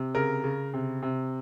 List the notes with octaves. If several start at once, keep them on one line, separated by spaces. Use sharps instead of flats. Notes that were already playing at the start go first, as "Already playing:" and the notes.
Already playing: C3
C#3 A#4
C#3
C3
C3